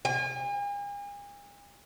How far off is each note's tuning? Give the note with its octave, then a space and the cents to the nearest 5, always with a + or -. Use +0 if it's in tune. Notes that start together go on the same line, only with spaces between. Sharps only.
G#5 -40